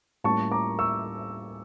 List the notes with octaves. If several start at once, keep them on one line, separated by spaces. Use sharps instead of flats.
A2 G3 A#3 C#4 A5 C#6
A#5 D6
C#6 E6